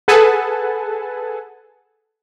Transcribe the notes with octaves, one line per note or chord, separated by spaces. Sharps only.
G#4 A4 B4 F#5 G#5 A5